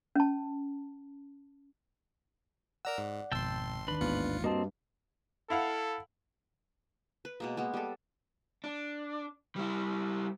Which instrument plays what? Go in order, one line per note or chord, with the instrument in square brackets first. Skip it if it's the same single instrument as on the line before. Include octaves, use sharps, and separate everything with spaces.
[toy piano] C#4 A5
[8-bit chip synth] A#4 A#5 E6 [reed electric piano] D5 F#5
[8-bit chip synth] G#2
[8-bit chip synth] G#1 C6 [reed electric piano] F2 B2 [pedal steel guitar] G5 A5 E6
[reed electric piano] D#2 D#3 [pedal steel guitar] D4 B4 B5
[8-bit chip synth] A1 F4 C#7 [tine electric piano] D#2 G#2 [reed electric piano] B3
[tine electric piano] G2 [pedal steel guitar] A#3 C4 [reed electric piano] F#4 D#5 A5
[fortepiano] E4 F5 F#5 [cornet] A4
[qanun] B4
B2 G#3 A#3
G#3 A#3 B3
G3 A4
[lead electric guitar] D4
G3 E4